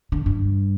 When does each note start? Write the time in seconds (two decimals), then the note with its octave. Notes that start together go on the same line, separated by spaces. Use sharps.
0.12 D3
0.26 G2